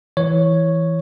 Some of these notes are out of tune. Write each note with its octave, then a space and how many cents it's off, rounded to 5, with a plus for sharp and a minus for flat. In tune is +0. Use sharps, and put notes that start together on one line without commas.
E3 +0 C#5 +0